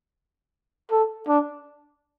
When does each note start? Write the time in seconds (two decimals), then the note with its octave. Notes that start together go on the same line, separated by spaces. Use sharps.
0.92 A4
1.28 D4